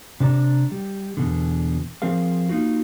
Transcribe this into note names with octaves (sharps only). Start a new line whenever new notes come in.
C3 D4 A#4 A#5
G3
E2 B2 D3
F3 C4 G#4 A#4 F5
A#3 D#4 F4 F#4